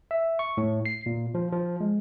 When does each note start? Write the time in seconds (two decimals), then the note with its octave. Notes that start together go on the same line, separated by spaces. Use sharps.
0.11 E5
0.39 C#6
0.57 A2
0.86 C7
1.06 A#2
1.34 F3
1.52 F3
1.80 G#3